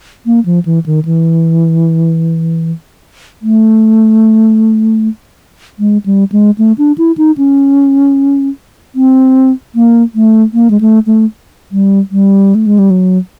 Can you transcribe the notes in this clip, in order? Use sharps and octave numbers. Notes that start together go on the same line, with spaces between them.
A#3
F3
E3
D#3
E3
A3
G#3
G3
G#3
A3
D4
E4
D#4
C#4
C4
A#3
A3
A#3
G#3
A3
A3
G3
G3
A3
G#3
G3
F#3